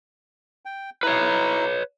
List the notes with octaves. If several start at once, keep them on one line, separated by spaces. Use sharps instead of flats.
G5
E4 B4 C#5 A#5